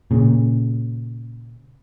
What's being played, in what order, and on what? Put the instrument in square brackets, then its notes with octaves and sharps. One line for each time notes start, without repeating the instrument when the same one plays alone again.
[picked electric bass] A#2 C#3